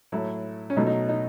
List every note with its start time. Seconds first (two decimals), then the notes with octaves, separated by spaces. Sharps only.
0.12 A2 F#3 A3 E4
0.70 C#4
0.76 B2 F#3 A3 D#4
0.87 D#4
1.09 D#4